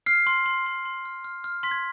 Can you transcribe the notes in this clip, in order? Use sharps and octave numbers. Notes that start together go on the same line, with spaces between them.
F6 C7
C6
C6
C6
C6
F6
F6
F6
C6 B6
G#6